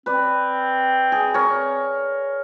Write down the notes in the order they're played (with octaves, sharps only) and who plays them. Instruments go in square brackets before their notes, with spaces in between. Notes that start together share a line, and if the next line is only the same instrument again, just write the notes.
[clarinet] C4 [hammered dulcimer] B4 D5
[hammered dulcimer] G#4
A#4 C#5